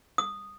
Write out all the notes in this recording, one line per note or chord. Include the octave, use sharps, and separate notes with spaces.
D#6